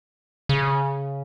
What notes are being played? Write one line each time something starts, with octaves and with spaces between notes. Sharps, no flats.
C#3